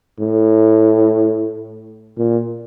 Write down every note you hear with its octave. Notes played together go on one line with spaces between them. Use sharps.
A2
A#2